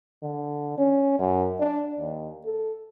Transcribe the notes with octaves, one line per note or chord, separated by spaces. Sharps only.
D3
C#4
F#2
D4
D#2
A4